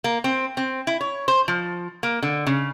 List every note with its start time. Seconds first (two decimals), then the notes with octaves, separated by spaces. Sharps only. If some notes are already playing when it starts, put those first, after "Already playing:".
0.04 A#3
0.24 C4
0.57 C4
0.87 E4
1.01 C#5
1.28 C5
1.48 F3
2.03 A#3
2.23 D3
2.47 C#3